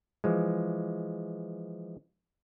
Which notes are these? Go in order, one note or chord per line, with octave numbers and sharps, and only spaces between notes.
E3 F3 G#3